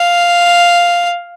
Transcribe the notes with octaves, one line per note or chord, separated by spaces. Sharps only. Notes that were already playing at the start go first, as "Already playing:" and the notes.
Already playing: F5